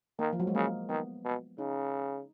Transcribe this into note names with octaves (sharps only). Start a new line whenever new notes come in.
D#3 A#3
F3
F#3
G#3
C#3 A#3
D#3 B3
B2
C#3 D#4